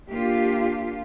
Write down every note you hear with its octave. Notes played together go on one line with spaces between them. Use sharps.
A#3 D4 F4 G4